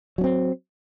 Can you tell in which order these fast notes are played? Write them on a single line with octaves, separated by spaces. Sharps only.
F#3 C#4 C4